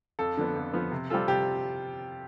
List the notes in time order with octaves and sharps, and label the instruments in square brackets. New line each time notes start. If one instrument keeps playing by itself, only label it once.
[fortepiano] F2 [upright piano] A4
[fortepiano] D3 F3 B3
F2
D3 F3 B3
C3
G3 C4 F4 A4
[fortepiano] C3 [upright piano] G4